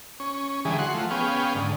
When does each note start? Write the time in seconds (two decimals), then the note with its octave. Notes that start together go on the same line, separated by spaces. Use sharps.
0.20 C#4
0.65 D3 E3 G3 G#3 G#4
0.79 F#4 F#5 C6
0.94 F3 A3
1.11 B3 C#4 G#4 F5 G5
1.55 G#2 D3